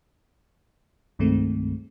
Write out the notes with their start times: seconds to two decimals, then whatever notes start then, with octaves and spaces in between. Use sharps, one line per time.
1.19 C2 G2 D#3 G#3 A3 C4